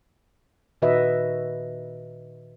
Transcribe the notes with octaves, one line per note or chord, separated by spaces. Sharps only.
A#2 D#3 F#4 B4 D#5 E5